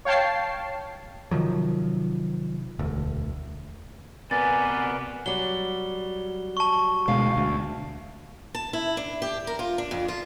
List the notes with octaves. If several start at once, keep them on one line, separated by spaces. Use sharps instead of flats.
C#5 F5 G5 A5 C7
C3 D#3 F3 F#3
E1 D2
C3 B3 A#4 B4 D5 G#5 A6
F#3 G3 G7
A5 C#6
D2 B2 G#3 F5
D2
A5
E4
D4
G4
A#4
F4
D4
F2
F4